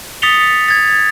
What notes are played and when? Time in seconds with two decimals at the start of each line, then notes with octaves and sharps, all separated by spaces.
0.22 D#6 A6 B6 C#7 F7 G7
0.69 G#6 A6